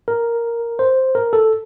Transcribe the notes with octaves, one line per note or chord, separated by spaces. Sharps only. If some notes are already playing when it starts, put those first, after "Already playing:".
A#4
C5
A#4
A4